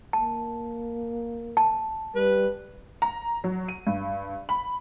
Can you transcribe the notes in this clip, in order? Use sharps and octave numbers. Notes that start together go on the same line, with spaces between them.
A#3 A5
A5
G3 B4
A#5
F#3
D#7
G2
B5